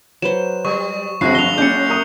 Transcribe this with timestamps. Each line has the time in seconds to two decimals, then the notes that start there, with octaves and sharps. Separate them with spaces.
0.22 F#3 B4 C5 E7
0.65 G3 C#6
1.21 G1 G#3 C4 F4 F#4 F#6 C7
1.35 G1 F3 F7 G7
1.58 F#1 C#4 D5 G6 C#7
1.90 A#4 E5 D#6